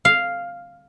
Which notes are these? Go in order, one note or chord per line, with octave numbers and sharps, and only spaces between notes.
F5